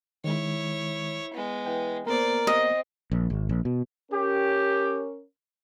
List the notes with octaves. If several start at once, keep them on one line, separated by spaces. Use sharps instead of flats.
D#3 G#3 E4 C#5
G#3 B3
E3 G5
A#3 B3 A#4 C5 D5
C4 D#5
A#1
G#1
A#1
B2
C#4 G4 A#4